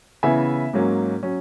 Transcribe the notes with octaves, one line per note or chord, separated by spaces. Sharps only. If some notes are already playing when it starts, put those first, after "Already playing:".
C#3 E3 B3 E5 G#5
G#2 F#3 A#3 C#4
F#3 C#4